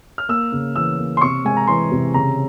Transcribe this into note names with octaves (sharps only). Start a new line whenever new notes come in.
F6
A#3 E6
C#3
E3 E6
A#3
C6
C3 C#6
G#3 G#5
A#5
E3 C6
C3
C#3 A#5